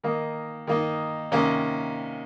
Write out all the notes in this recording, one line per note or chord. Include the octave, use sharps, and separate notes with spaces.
D#3 A#3 D#4
D#3 A#3 D#4
C3 D#3 A#3 C#4